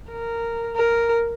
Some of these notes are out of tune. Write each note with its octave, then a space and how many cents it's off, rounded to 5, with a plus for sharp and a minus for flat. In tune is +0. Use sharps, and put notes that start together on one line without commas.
A#4 -10
A#4 +0